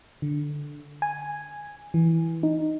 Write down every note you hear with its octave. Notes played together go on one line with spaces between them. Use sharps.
D3
G#5
E3
D#4